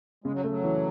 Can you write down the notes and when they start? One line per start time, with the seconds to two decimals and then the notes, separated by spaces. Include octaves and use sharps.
0.24 C#3 G#3
0.33 F#3
0.44 A3
0.50 F#3
0.64 E3